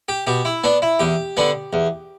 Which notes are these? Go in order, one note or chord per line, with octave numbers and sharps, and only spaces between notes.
G4
B2 G4
E4
B3 D4
E4
E2 G4
D3 B3 D4
E2